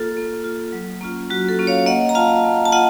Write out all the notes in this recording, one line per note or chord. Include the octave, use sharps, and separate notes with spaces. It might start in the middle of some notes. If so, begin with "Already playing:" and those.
Already playing: A#3 F4 A4
A#3
F4
F#3
A#3 C#4 F4
F#3 F#4
A4
A#3 C#4 F4
C#5 F5
A#3 D#5 F#5
A#5
F4 F5 A5
A#3
A5
F4 D#5 F#5